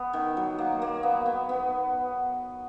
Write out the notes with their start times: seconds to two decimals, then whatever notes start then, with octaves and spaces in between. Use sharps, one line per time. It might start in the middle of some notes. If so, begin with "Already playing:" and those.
Already playing: B3
0.13 D#3
0.37 F#3
0.59 A#3
0.82 A#3
1.03 B3
1.26 B3
1.49 B3